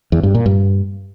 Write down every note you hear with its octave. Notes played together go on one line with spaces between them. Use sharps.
E2
G2
A#2
G2